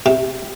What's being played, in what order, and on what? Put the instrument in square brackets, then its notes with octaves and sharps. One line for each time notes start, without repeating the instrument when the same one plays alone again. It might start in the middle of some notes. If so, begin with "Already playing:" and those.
[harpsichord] C3